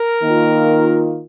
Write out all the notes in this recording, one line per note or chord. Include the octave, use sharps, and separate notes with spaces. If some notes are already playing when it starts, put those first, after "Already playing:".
Already playing: A#4
D#3 A#3 F4